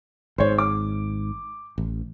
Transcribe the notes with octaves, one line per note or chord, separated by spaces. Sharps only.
G#1 G#2 C5 C#5
D6
A1